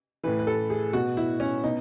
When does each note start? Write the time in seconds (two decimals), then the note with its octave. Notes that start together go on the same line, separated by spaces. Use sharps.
0.24 A2 E3 B4
0.39 B4
0.47 A4
0.70 G#4
0.93 B2 F#4
1.17 E4
1.40 C#4
1.64 B2 D#4